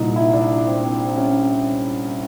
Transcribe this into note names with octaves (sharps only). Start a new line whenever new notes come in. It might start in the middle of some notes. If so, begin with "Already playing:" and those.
Already playing: C2 A#2 D#4
E4
D4
C4
C4
C#4